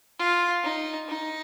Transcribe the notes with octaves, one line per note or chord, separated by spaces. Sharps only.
F4
D#4
D#4